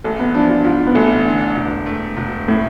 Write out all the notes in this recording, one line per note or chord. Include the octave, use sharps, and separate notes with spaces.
A1 A3
B3
F3 D4
F4
G#2 F4
B3
A1 A3
D3
E1
A3
E1
A2